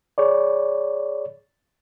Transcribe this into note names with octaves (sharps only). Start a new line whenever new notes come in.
G#4 C#5 D5